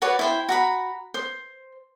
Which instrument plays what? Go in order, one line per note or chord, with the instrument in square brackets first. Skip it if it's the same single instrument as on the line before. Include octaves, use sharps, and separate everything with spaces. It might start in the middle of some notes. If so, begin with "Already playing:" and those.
[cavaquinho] F#4 B4 C#5 D5
E4 C5 G5
F#4 A#5 B5
C5